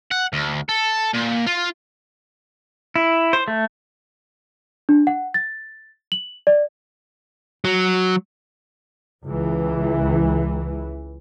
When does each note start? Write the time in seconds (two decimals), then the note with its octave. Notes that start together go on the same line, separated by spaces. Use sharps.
0.11 F#5
0.33 D2
0.69 A4
1.13 A#2
1.47 F4
2.96 E4
3.33 C5
3.48 A3
4.89 D4
5.07 F#5
5.34 A6
6.12 F#7
6.47 D5
7.65 F#3
9.24 C#2 E3